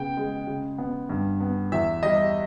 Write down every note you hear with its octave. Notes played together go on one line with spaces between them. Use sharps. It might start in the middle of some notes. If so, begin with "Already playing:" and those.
Already playing: C#3 B3 G5
G#3
C#3
B3
G2
B3
E2 E5
G3 D#5